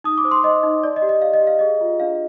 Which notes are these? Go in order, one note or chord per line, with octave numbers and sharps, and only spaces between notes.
D#4 D#6
D6
C5
C6
C5 D#5
D#4
D5
D#5
G4
D#5
D5 F5
D#5
G4
F5
G#4 D#5
F4
D4 F5